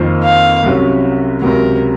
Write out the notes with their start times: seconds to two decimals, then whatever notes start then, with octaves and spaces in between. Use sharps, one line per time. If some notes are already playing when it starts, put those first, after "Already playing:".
Already playing: F2 D#3 A#3 F4 C5
0.23 F5
0.63 C2 C3 F#3 C#4
1.42 C#2 C3 F#3 A#4